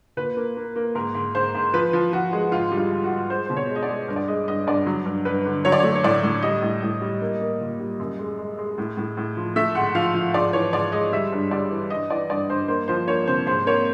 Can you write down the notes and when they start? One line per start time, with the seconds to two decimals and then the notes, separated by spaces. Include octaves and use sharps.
0.17 A#2 B4
0.37 A#3
0.57 A#3
0.76 A#3
0.95 G#2 A#4
1.15 G#2
1.35 G#2 C5
1.55 G#2
1.73 F3 B4
1.93 F3
2.13 F3 F#4
2.33 G#3
2.52 G#2 F4
2.72 G3
2.78 F4
2.91 G#2
3.04 F#4
3.10 G#2
3.30 G#3 C5
3.46 B2 C5
3.57 C#5
3.70 G#3
3.76 D#5
3.83 D5
3.89 G#3
4.08 G2
4.16 D5
4.28 G#3 D#5
4.48 G2 D#5
4.67 G2 D5
4.87 F#3
5.06 G2
5.25 G2 B4
5.46 D3
5.65 F#3 C#5
5.72 D5
5.80 A3 C#5
5.95 C#5
6.04 A2 D5
6.23 A2
6.42 G3 D#5
6.62 A2
6.82 A2
7.01 G3
7.21 A#3
7.41 A#3
7.60 A#2
7.80 G3
7.99 F#2
8.19 G#3
8.39 G#3
8.58 G#3
8.78 A2
8.97 A2
9.17 A2
9.37 F3
9.56 A3 E5
9.75 G#2 F#5
9.95 F3 F5
10.14 F3
10.34 G#2 D5
10.53 E3 C#5
10.73 G#2 D5
10.92 G#3 D#5
11.12 G3 E5
11.32 G2
11.51 G3 D5
11.71 E3
11.90 G2 D#5
12.10 E3 D5
12.30 G2 D5
12.49 G2 C5
12.68 A#3 C5
12.88 F3 C5
13.07 A#3 C#5
13.27 C3 C5
13.47 G#2 C5
13.66 A#3 C#5